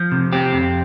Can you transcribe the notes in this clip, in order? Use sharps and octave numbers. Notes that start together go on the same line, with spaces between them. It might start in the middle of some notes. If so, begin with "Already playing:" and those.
Already playing: F3
C3
C4 G4
F2